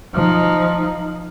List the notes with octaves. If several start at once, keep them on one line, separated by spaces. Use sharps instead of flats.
F3 D#4